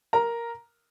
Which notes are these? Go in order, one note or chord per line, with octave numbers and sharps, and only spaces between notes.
A#4 A#5